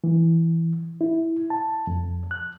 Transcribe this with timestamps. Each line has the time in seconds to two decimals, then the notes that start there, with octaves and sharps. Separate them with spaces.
0.04 E3
1.01 E4
1.50 A5
1.87 F2
2.31 F#6